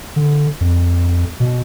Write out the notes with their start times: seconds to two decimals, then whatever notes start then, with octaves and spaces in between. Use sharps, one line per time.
0.16 D3
0.61 F2
1.40 B2